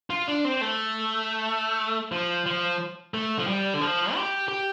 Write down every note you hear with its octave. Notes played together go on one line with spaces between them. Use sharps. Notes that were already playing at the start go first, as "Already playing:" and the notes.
F4
D4
C4
A3
F3
F3
A3
F3
G3
D3
F3
G4
G4